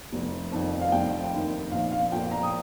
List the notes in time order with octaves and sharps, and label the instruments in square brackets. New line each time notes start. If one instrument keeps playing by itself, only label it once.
[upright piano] F1
F2 D#3
F5
F1 G5
D#2 D#3
A#1 F5
F5
A#2 F3 G5
A#5
D#6